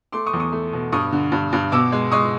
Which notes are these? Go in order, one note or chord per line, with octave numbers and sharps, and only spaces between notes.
A3 C6 D6
C#6 D#6
E2
C#6 D#6
A3
B2
G2 C#6 D#6
D3
G2
G2
B2 D6 E6
G#3
G#3 C#6 D#6